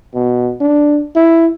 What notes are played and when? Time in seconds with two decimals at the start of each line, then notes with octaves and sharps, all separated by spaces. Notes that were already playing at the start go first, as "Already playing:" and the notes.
0.14 B2
0.60 D4
1.15 E4